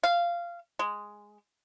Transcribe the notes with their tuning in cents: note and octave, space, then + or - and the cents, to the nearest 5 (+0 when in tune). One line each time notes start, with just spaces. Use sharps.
F5 -15
G#3 -5